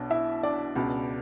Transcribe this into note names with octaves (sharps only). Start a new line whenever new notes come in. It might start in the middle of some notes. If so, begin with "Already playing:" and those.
Already playing: B1 B2 D4
E4 E5
D4 D5
C#2 B2